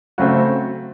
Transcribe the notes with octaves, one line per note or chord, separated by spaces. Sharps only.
C#3 F#3 A3 C4 F#4